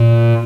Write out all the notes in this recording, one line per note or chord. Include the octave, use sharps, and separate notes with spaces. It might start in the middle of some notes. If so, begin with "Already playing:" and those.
Already playing: A#2